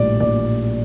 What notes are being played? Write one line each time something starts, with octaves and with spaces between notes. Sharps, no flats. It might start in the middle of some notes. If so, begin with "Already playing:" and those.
Already playing: A#1 A2 G3 D5
A#1 D5